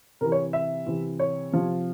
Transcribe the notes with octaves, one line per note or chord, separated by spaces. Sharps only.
C3 E3 A#4
C#5
E5
C3 E3
C#5
C3 F3